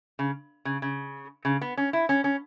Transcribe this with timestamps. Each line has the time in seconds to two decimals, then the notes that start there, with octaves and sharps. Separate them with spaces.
0.19 C#3
0.65 C#3
0.82 C#3
1.45 C#3
1.61 B3
1.77 C#4
1.93 E4
2.09 C#4
2.24 C#4